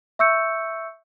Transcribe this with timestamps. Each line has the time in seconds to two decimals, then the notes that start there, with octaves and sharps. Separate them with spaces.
0.19 E5 C#6 E6 G6 C#7